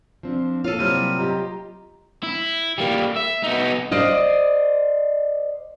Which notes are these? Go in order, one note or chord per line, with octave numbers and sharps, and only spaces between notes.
F3 C4 D4
A#3 E4 F4 A4 C#5 F5 D#7
C3 F#3 G3 F6 D#7
F4 G4 D#5 A#5
E4
G3 A#3
E5
B3 D#4
C5 D5 D#5 F5